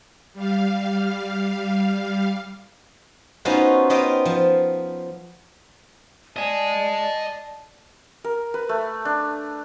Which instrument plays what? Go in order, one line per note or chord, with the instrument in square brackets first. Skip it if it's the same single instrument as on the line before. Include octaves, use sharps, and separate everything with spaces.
[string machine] G3 F5
[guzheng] B3 C#4 D#4 F4 F#4 C5
B3 C5 D#5 F5 G5
F3
[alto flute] D5 [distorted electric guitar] D#5 G#5 [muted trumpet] A5
[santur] A#4
B4
A3
D4